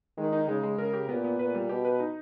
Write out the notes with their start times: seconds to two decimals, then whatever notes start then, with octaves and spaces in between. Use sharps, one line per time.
0.18 D#3 G#3
0.33 D#4
0.48 C#3 G#3
0.63 G#3
0.78 C#3 A#4
0.93 G4
1.09 A#2 B3
1.24 B3
1.39 A#2 B4
1.55 G3
1.69 B2 G4
1.85 B4
2.00 D#4